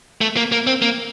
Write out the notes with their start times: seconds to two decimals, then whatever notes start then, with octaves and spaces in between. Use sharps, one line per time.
0.21 A3
0.37 A#3
0.52 A#3
0.67 C4
0.82 A#3